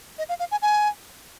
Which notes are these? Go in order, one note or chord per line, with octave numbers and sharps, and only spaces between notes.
D#5
F5
F5
G#5
G#5